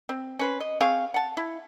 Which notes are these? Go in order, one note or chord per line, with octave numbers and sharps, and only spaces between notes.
C4
C#4 B4 C5
D#5
C4 G#4 F5 C#6
F#5 A5
E4